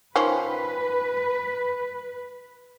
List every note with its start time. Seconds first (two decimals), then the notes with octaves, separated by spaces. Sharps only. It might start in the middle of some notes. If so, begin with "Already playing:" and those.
0.16 D#3 F3 C#4 B4